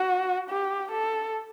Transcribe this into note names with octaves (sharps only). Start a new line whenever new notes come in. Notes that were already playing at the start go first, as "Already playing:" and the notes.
Already playing: F#4
G4
A4